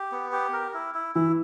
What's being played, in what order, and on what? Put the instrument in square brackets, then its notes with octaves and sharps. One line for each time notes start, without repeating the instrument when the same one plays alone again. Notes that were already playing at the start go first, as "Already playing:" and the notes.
Already playing: [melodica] G4
B3
G4
A#4
E4
E4
[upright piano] E3 [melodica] E4